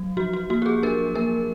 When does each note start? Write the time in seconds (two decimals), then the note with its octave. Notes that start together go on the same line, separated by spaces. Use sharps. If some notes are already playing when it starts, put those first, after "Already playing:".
Already playing: F#3
0.17 F3 F#4
0.33 F#4
0.50 A#3 F#4
0.62 G4
0.66 G#4
0.83 D4 A#4
1.15 A#3 A#4